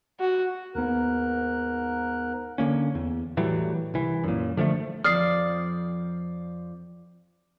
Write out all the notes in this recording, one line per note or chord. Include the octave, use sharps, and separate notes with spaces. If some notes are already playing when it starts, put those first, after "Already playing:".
F#4
D#2 G#2 B3 A#4 F#6
D3 D#3 A#3 C#4
E2
A2 E3 F#3 G3
C2 E3
F#2 A#2
D3 F3 G#3 A3
F2 F3 D5 D#6 F6 C7